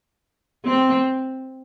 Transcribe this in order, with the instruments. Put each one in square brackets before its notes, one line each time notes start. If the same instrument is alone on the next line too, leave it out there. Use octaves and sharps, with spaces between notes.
[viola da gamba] C4